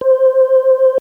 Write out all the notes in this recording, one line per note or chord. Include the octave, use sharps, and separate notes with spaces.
C5